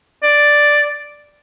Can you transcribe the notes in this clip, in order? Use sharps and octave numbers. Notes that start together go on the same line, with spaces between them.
D5